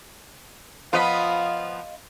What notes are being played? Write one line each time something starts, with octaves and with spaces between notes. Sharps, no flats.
F3 B3 F4 D#5 F5 B5